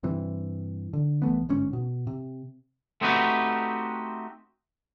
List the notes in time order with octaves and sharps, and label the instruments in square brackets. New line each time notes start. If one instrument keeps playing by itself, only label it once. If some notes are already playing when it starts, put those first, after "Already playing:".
[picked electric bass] G2 C3 E3
D3
C2 E3 A3 B3
G1 G#2 C#4
B2
C3
[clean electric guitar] A3 C4 D#4 F#4 G4 B4